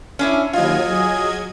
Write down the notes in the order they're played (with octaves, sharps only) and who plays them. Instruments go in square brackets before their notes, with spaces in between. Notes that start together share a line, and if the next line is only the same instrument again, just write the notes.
[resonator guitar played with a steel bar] C#4 D4 E4
[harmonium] D#2 [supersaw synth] F#3 D#5 G#6 [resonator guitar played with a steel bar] F4
[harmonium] G#4